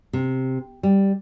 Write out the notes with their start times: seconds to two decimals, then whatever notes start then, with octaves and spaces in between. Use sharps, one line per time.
0.13 C3
0.83 G3